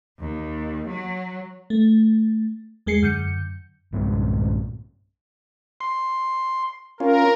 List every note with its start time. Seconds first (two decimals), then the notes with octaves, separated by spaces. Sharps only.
0.19 D#2
0.88 F#3
1.70 A3
2.86 E2 G#3 G#4 C7 C#7
3.02 F#2 D3 G6 C#7
3.93 B1 G2 A#2 G#3
5.81 C6
7.00 C#4 F4 A#4